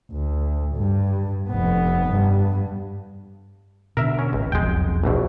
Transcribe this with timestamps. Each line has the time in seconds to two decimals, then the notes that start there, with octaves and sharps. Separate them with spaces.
0.11 D2
0.75 G2
1.49 F1 B3
2.10 G2
3.97 B2 D3 A#4 E5
4.19 C#4
4.33 G#1 C#2
4.52 E1 B1 F2 G#3 G5
5.04 A#1 E2 B2